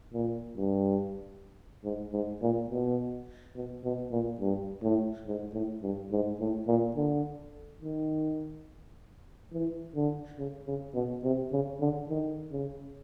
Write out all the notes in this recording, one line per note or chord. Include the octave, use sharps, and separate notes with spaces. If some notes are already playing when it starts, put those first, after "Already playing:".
A#2
G2
G#2
G#2
A#2
B2
B2
B2
A#2
G2
A2
G#2
A2
G2
G#2
A2
A#2
D3
D#3
E3
D3
C#3
C#3
B2
C3
C#3
D3
D#3
C#3